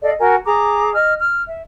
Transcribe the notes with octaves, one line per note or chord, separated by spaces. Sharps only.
A4 D5 D#5 F5
F#4 A#4 G#5
G#4 A#5 D6
D#5 F6
F6
E5